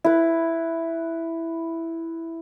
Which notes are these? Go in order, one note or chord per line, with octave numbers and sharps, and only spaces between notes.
E4 B4